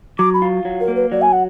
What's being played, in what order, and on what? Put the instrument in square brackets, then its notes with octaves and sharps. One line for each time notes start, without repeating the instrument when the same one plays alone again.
[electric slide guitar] F#3 [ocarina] D6
[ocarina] B5
[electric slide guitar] F4
F#3
[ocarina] A#4
[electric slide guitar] A#3
[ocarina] B4
[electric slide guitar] F#3 [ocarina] D5
[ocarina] G#5
F#5